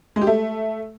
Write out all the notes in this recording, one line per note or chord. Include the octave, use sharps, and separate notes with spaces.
G#3
G4
A3